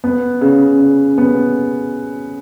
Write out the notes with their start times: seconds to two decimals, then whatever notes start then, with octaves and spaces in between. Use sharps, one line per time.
0.04 B3
0.41 C#3
0.79 C#3
1.18 B3